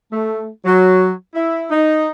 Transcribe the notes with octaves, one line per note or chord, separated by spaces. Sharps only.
A3
F#3
E4
D#4